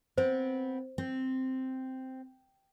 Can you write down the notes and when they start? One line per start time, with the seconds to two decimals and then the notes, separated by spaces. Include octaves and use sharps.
0.18 B3 C4 C5
0.98 C4